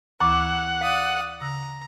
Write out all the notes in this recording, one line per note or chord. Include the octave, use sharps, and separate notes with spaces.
D2 E3 E4 F#5 A#5 C#6 D6 A6
D5 F5 D#6
C#3 A#5 E6 A#6